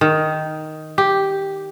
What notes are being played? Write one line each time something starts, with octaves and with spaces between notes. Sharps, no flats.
D#3
G4